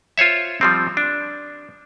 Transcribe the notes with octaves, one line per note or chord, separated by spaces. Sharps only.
F4 C5 C#5 E5
F3 G3 C4
D4